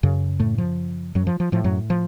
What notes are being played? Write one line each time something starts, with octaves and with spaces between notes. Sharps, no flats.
F#2 C#3
A2 A3
F3
F#2 F#3
F3
F3
A2 F3
F#2 F#3
F3